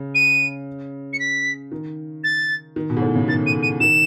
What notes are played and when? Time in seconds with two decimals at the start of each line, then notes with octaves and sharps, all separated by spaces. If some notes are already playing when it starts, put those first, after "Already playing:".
Already playing: C#3
0.15 D#7
1.13 C#7
1.19 B6
1.72 D#3
2.24 A6
2.76 D#3
2.90 B2
2.97 G#2
3.02 A2
3.15 C#3
3.28 D#3 A6
3.46 D#7
3.63 D#7
3.80 D#3 E7